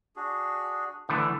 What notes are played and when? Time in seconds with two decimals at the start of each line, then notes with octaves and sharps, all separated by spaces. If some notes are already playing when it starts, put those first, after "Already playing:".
0.16 D4 F#4 G#4
1.09 D3 E3 A3 D4 F#5